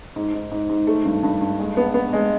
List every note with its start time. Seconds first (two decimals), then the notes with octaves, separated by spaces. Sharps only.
0.16 G#2
0.34 G#2
0.51 G#2
0.69 G#2
0.87 A3
1.05 G2
1.23 G2
1.41 G2
1.59 G#3
1.77 B3
1.94 B3
2.13 G#3